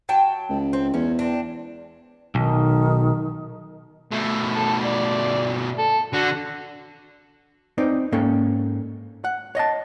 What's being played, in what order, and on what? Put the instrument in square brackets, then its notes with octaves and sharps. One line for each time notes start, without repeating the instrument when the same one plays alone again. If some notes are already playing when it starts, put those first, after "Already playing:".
[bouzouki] F#3 G5 A5
[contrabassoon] C#2
[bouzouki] C4
[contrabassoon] E2 [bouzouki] C#4
[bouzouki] C4 D4
[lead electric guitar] B1 [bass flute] D#3
[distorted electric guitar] B2 A3
[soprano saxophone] A4
D5
A4
[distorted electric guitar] D3 D4 [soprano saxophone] F#4
[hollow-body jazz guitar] C4 D#4 B4 D5
G#2 A#3 C#4 A4 G5
F#5
C#5 D#5 F5 A5